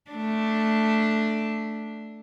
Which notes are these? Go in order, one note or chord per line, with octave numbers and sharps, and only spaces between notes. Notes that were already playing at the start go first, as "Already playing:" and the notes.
A3 D4